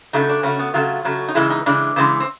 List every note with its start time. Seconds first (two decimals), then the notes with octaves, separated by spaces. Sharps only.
0.13 C#3 F#3 A3 D#4
0.29 D4
0.43 C#3 F#3 A3 C#4
0.59 B3
0.74 C#3 F#3 A3 F4
1.05 C#3 F#3 A3
1.28 D#4
1.35 C#3 E3 G#3 E4
1.50 D#4
1.66 C#3 E3 G#3 D4
1.96 C#3 E3 G#3
2.20 C4